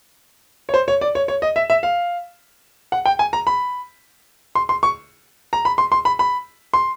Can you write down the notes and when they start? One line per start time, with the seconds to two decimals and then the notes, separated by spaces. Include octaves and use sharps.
0.69 C#5
0.74 C5
0.88 C#5
1.01 D5
1.15 C#5
1.28 C#5
1.42 D#5
1.56 E5
1.70 E5
1.83 F5
2.92 F#5
3.06 G5
3.19 G#5
3.33 A#5
3.47 B5
4.55 C6
4.69 C6
4.83 C#6
5.53 A#5
5.65 B5
5.78 C6
5.92 C6
6.05 B5
6.19 B5
6.74 C6